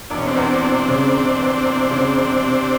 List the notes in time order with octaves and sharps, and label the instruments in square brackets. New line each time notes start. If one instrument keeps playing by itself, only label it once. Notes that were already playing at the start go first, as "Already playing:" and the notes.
[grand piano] E1 [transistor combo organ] D4
[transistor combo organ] C#4
C4 D4
[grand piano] E2
E1
C#3
E1
E2
E1
C#3
E1
C3